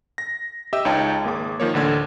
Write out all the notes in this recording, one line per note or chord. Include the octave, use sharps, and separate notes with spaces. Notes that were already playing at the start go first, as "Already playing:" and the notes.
A#6
G4 D#5 E5 E6
C#2 D#4 C#5 F5 G5 A5
G#1 A#3 G#4 D6
D#3 F3 A#3 C#5
A1 D2 D3 G#6